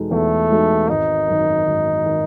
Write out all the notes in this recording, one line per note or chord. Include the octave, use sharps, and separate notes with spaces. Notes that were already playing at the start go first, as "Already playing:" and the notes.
Already playing: E2 B2 G#3 D#4 A4
E2 A3
B2 G#3 D#4 A4
G#1 D#4
F#2 D#3
G#1
D#3